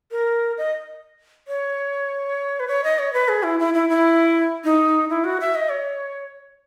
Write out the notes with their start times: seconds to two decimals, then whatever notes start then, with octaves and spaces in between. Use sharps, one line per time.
0.11 A#4
0.58 D#5
1.48 C#5
2.60 B4
2.68 C#5
2.84 D#5
2.99 C#5
3.13 B4
3.29 G#4
3.43 E4
3.59 E4
3.74 E4
3.89 E4
4.64 D#4
5.10 E4
5.24 F#4
5.40 E5
5.55 D#5
5.69 C#5